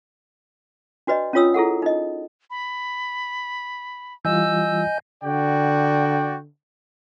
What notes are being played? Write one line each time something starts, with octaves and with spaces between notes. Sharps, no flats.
D4 F#4 B4 D5 D#5
C#4 D4 F4 C#5 D#6 E6
E4 G#4 A4 F#5
D#4 D#5
B5
E3 G3 F4 D#5 G#5 E6 G6
D3 F#4 D5 G5